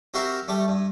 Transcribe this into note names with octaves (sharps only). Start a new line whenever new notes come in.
C4 F#4 G4 A#4 E5 F5
G3 A3 G4
G2